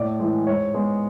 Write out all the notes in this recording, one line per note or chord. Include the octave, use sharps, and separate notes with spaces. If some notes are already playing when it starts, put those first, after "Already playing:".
Already playing: A2 D5
E3 G#3
G#2 C#5
G#3 B3